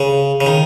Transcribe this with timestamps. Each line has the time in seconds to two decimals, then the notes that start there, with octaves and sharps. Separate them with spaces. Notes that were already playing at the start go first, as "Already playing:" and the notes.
Already playing: C#3
0.41 C#3
0.46 D#3